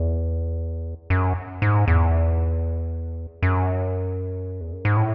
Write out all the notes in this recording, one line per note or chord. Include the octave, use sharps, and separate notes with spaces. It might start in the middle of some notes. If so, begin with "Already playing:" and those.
Already playing: E2
F#2
G#2
E2
F#2
E2
F#2
G#2
A2